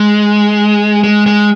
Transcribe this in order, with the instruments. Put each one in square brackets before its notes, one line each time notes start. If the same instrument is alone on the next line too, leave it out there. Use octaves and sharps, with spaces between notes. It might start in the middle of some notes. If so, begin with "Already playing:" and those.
Already playing: [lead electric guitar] G#3
G#3
G#3